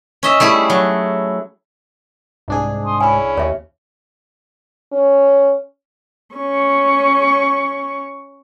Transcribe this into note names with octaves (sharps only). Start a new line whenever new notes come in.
C#4 D#5 E5
G3 A3 E4 G#4
F#3
C2 G#2 D4 G#4
C6 D#6
C#4 E4 G#5 B5
D#2 C#5 E5
C#4
C#4 C#6